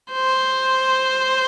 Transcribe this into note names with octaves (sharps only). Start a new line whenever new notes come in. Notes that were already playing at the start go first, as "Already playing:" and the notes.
C5